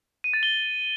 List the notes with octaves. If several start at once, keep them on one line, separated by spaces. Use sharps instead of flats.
D#7
A6
G7